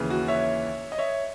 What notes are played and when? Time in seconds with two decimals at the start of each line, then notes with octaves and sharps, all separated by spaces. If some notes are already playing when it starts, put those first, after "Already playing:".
Already playing: D#2 C#3 E3
0.10 F#4
0.28 C#5 E5
0.92 D#5
0.98 C#5 E5